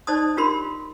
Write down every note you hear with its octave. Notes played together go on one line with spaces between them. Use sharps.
D#4 C5 D5 D#5 A5 D#6
D4 F4 G4 A#4 B5 C6